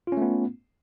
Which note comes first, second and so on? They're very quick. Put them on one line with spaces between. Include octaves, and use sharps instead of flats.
F4 C#4 A3 B3